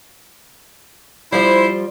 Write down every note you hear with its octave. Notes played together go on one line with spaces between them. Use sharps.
F3 G3 E4 C5